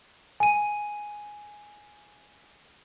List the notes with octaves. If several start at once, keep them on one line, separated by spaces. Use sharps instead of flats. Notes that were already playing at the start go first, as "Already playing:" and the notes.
G#5 D#7